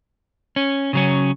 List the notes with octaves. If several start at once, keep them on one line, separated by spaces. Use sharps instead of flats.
C#4
C#3 F#3 C#4